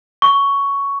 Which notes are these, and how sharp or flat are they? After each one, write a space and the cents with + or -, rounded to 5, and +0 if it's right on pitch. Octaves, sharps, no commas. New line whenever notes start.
C#6 +10